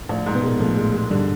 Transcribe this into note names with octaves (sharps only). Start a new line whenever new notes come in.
A#1 A2 A3
G#2
B2 B3
A#2 G#3 A#3
A2 F3 A3
G#3
G#3
G2 D3 G3